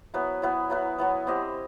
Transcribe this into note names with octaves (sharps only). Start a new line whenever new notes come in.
F#3 B3 E4 B4
F#3 B3 E4 B4
F#3 B3 E4 B4
F#3 B3 E4 B4
C4 E4 G4 D#5